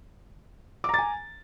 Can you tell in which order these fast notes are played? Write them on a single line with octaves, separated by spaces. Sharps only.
D6 A#5 A6 G#5